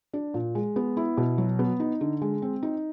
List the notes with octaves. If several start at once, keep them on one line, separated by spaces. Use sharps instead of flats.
D4
A#2
G#3
B3
E4
B2
F#3
B3
D#4
D3
G#3
C4
D#4